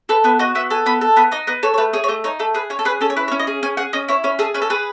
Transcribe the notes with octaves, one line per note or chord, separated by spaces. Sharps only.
A4 B4
B3 B4
F#4 D#5
B3 E5
A4 G#5
B3 B5
A4
B3 B5
D#4 D#5
B3 D#5
A4 C#5
C#5
A3 B4
G#4 C#5
C#5
A3 D#5
D#4 C#5
A3 A4
G#4 B4
C#4 C#5
A4
G#4 B4
C#4 A4
C#5
E4 B4
C#5
C#4
D#5
G#4
C#4 G#5
G#4 F#5
C#4 D#5
E4 C#5
C#4 C#5
G#4 A4
C#4 B4
A4
G#4 B4